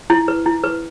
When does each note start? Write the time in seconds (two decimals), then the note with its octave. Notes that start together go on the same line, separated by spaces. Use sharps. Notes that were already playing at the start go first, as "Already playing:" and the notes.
0.10 E4
0.28 B4
0.46 E4
0.64 B4